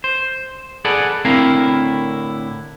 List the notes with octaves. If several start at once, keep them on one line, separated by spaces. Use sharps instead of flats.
C5
G#4 A4 B4 D5 F#5
A2 D3 C4 E4 A#4 F5